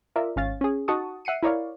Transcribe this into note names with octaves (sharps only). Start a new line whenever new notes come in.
F4 A#4 D5 E5
G#1 C#4 F5 A6
C#4 G#4
D#4 F#4 F#5 A5 C#6 D#6
E5 F#5 C7 C#7 D#7
E4 A#4 C#5 D5 F5